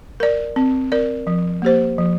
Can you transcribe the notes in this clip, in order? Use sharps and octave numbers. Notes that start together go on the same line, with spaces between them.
A#4 D5
C4
A#4 D5
F3
A#3 G4 C5
F3